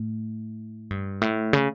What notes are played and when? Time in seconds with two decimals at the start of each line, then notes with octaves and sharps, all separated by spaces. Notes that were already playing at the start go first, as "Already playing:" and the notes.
Already playing: A2
0.90 G2
1.21 A2
1.53 C#3